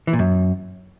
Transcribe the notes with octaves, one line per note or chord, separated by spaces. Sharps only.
E3
A#2
F#2